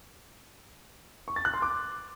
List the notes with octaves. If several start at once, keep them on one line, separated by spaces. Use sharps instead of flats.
C#6
A6
F#6
C6
D6